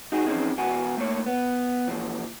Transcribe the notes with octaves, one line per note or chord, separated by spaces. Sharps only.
D#4 F#4 G#4
E3 F3 C4 C#4 D#4 G#4
E2 B2 B3 F#4 G#5
A3 A#3 C#5
B3
A#2 E3 F3